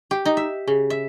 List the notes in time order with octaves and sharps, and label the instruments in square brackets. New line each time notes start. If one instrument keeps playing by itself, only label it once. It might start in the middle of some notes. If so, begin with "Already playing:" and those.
[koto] G4
D#4
E5
C#3
E5